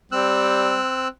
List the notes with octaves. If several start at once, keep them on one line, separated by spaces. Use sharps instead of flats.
G3 C4 E6 F#6